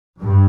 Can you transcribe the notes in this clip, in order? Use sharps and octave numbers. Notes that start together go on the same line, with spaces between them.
G2